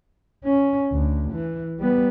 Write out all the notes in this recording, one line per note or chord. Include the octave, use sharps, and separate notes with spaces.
C#4
D2
E3
G3 B3